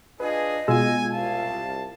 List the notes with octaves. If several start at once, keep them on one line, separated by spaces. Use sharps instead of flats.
D4 F4 G#4 B4 D#5
B2 G#3 F4 G#5 E6
C2 F5 A5